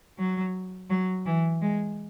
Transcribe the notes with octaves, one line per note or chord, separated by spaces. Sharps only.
F#3
F#3
E3
G#3